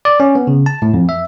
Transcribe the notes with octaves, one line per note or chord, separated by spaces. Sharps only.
D5
C#4
B3
C#3
A5
A2
F2
E5